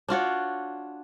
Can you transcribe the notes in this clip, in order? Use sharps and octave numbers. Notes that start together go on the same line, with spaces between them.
D4 F4 F#4 C#5